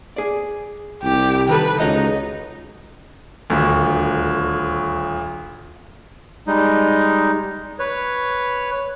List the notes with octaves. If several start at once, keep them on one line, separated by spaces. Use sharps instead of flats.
G#4 D5
C2 G4
D#3 A4 B4
C#2 D#4 F#4 C#5 D#5
D#1 D2
G3 G#3 D#4
B4 C#5